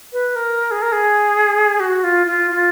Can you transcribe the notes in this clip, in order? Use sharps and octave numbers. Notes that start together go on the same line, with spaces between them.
B4
A#4
G#4
A#4
G#4
F#4
F4
F4
F4